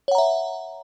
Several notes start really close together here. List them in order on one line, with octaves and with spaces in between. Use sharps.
C#5 F#5 A#5 E5